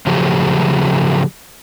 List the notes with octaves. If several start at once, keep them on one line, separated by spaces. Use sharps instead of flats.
C#3 F3 F#3 A3 G4 G#4